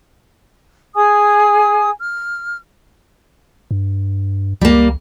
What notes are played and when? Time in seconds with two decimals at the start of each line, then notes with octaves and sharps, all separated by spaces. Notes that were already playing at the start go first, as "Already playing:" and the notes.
0.95 G#4 G#5 D#6
2.00 F6
3.71 G2
4.61 C#2 G3 A#3